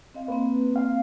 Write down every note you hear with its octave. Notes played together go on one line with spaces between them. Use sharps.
C4 D#5 F5
A#3 C4 B4
F5